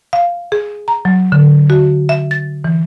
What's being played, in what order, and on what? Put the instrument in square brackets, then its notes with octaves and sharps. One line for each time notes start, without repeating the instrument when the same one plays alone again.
[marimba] F5
G#4
A#5
F#3
D3
F#4
E5
A6
E3